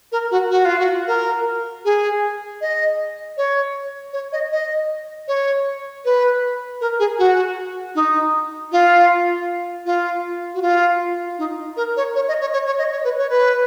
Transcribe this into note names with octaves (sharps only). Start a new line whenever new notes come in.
A#4
F#4
F#4
F4
F#4
A#4
G#4
D#5
C#5
C#5
D#5
D#5
C#5
B4
A#4
G#4
F#4
D#4
F4
F4
F#4
F4
D#4
A#4
C#5
C#5
D#5
C#5
C#5
C#5
D#5
C#5
B4
C#5
B4